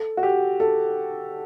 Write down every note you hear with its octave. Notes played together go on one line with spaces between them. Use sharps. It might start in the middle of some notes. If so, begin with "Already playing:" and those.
Already playing: A4
F#4
G4
A4